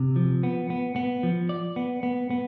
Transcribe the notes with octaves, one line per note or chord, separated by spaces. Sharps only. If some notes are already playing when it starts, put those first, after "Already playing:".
Already playing: C3
F3
B3
B3
B3
F3
D5
B3
B3
B3